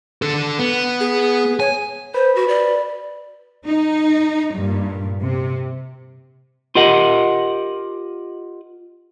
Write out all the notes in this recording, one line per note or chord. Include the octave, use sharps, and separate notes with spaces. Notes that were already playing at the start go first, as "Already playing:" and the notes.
D3 A4
B3
G#4
C#5 G#5
B4 C5
F#4
D5
D#4
G2 A#2
C3
F4 G4 A#4 D#5 F#5